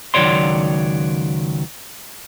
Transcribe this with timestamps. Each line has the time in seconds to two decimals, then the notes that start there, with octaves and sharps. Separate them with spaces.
0.14 C#2 D#3 F#3 C#5 D5 C6